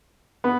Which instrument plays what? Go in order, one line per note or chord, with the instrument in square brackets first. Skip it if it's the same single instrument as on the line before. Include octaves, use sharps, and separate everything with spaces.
[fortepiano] B3